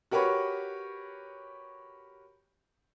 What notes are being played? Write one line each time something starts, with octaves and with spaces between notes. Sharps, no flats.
F#4 G4 A#4 B4 C#5